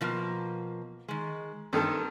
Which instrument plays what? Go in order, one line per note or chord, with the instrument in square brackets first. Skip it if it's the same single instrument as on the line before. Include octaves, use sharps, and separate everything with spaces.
[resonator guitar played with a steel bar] B2 F3 A#3
D#3 G#3
[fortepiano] G2 D#3 A4 [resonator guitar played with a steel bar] C4 A5